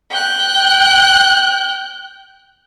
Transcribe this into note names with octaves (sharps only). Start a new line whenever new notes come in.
G5 F#6